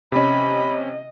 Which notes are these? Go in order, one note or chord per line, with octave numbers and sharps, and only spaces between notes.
C3 C#4 D#5 B5